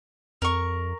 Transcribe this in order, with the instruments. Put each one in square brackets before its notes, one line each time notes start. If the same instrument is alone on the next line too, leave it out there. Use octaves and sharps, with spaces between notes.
[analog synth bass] F2 [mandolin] A#4 C#6